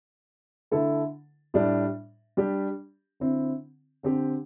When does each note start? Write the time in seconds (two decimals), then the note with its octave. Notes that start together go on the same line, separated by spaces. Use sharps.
0.71 D3 A3 E4 A4
1.54 A2 G3 D4
2.37 G3 D4 G4
3.20 D3 C4 E4
4.03 D3 C4 G4